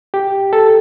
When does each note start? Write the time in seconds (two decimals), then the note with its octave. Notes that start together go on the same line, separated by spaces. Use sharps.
0.14 G4
0.53 A4